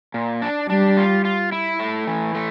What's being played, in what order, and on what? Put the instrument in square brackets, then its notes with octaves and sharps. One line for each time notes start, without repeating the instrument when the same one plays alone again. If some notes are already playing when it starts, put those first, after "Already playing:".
[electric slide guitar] A#2
D4
[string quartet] G3 [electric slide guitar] D4
[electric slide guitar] F4
F4
E4
A3
E3
A3